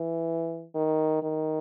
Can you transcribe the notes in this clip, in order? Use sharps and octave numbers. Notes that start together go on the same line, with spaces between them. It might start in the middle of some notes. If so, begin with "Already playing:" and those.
Already playing: E3
D#3
D#3